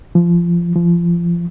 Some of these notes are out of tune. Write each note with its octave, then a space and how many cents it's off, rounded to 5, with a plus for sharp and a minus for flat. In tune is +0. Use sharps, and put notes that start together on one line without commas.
F3 -20
F3 -25